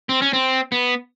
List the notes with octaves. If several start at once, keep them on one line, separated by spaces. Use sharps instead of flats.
C4
C#4
C4
B3